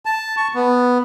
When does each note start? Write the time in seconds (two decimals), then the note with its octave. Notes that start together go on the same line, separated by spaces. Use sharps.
0.06 A5
0.37 C#6
0.55 B3